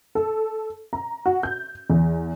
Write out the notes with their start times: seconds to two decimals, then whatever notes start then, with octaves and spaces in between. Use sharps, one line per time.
0.15 A4
0.93 A#5
1.26 F#4
1.43 G6
1.90 E2